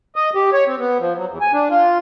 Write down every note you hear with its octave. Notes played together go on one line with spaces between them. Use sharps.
D#5
G4
C#5
C4
B3
F3
F#3
E2
G#5
D4
F4